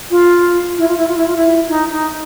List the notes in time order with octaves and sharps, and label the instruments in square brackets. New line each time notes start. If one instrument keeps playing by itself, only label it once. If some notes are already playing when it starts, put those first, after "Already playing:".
[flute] F4
E4
F4
E4
F4
E4
F4
E4
D#4
D#4